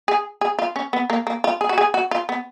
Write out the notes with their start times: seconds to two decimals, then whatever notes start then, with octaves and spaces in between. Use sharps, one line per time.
0.08 G#4
0.41 G#4
0.59 F4
0.76 C#4
0.93 B3
1.10 A#3
1.27 A#3
1.44 F4
1.61 G#4
1.69 F#4
1.78 G#4
1.94 F#4
2.11 F4
2.29 B3